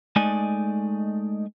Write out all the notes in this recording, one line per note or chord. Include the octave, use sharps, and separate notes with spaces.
G#3 A3 D#4 D5 G#5